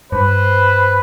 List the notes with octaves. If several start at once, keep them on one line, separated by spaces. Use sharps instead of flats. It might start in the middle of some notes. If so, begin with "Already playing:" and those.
G2 B4 C5